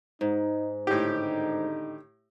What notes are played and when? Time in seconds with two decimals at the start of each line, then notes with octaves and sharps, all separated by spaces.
0.21 G#2 D#4
0.87 G#1 A2 D3 D#4 G4